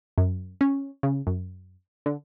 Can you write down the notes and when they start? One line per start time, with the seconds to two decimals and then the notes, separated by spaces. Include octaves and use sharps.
0.18 F#2
0.61 C#4
1.03 C#3
1.27 F#2
2.06 D3